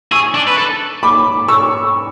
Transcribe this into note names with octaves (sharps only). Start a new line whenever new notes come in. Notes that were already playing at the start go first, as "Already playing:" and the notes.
G#4 C#6 E6
D4
B4
A4
B5 D6
C#6 E6